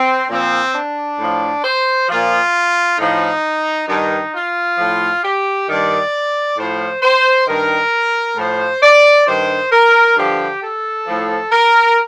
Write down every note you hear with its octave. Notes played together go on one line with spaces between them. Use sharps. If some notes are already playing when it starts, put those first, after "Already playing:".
Already playing: C4
A#2 F3 C4
D4
A2
F3
C5
A#2 F3 F4
A2 F3 D#4
G2 D#3 D#4
F4
A2 F3
G4
G2 D#3 D5
A2 F3 C5
C5
G2 D#3 A#4
A2 F3 C5
D5
G2 D#3 C5
A#4
G2 D3 F3 G4
A4
A2 F3
A#4